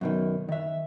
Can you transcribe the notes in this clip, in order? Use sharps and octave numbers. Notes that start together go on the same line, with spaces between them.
F#2 B2 D#3
D#3 E5